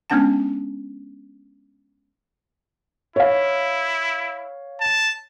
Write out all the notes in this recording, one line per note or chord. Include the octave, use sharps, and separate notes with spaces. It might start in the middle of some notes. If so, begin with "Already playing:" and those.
G#3 B3 C#4 D4 F#5 A5
E4 C#5 F5
A5